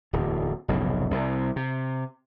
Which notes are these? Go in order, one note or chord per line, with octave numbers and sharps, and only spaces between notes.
D1 E2
F1 B1 G#2 C#3
C2 C3
C3